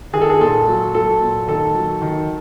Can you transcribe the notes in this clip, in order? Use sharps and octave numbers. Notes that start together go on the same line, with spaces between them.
D#3 G#4
A4
G#4
A#2 A4
F#3
F#3 A4
A#2
D#3 A4
F#3
D#3